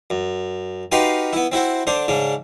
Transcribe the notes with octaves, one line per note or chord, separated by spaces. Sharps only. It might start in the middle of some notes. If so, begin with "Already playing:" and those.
F#2
D#4 F#4 G4 B4 F5 C6
B3 E4
C4 E4 F#4 C5
D3 D4 C5
G#2 C#3 D4